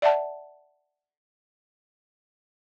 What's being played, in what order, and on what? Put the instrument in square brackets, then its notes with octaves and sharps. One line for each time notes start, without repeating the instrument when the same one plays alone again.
[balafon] D5 E5 F#5 A5